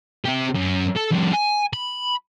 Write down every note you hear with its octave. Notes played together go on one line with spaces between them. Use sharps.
C4 G4
F#2
A4
F2 G3
G#5
B5